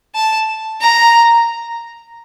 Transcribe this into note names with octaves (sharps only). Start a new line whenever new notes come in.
A5
A#5